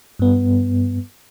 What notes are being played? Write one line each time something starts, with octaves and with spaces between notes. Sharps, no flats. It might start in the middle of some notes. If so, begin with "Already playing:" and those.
G2 B3